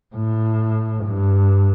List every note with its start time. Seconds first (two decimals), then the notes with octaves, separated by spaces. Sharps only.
0.15 A2
1.05 G2